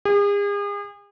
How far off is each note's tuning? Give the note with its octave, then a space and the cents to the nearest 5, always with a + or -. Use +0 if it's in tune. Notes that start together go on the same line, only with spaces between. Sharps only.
G#4 -40